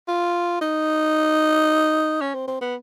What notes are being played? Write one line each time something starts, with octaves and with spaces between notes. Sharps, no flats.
F4
D#4
C#4
C4
C4
B3